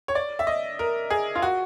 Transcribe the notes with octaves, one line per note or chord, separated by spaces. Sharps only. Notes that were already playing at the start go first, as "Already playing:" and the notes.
C#5
D5
E5
D#5
A#4
G#4
F4
F#4